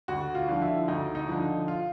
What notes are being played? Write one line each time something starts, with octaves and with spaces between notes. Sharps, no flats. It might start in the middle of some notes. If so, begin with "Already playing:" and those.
D2 F#4
F4
D3 F3
E4
D2 D#4
D#4
D3 F3
F4